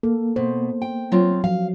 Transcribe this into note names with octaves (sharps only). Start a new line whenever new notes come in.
A#3 A4
B2 C5
G5
F#3 C4 F4
F3 F#3 F5